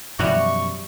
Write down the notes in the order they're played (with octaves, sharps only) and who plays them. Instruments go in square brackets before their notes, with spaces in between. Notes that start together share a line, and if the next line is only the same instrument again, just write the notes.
[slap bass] F#2 B2 F3 [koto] E3 G3 F#4 [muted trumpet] C#6